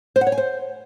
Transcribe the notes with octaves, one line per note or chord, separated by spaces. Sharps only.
C5
F#5
C#5
G#5
C5